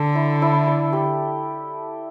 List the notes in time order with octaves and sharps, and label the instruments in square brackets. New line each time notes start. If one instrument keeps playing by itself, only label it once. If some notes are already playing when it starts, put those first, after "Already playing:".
Already playing: [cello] D3 [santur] A4
[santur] E4
E4
D5
G4